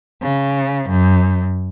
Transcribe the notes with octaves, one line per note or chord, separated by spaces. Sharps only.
C#3
F#2